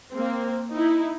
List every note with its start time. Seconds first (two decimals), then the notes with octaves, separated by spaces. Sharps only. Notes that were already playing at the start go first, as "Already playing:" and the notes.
0.12 A#3 C4
0.71 D#4 E4